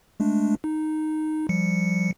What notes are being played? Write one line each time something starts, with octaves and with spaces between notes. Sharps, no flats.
G#3 A3 D4
D#4
F3 G3 C#7